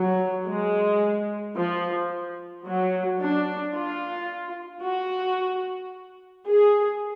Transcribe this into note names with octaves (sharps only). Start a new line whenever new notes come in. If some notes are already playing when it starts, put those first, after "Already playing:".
Already playing: F#3
G#3
F3
F#3
D4
F4
F#4
G#4